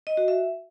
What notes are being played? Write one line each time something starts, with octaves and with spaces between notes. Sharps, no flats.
D#5
F#4
E5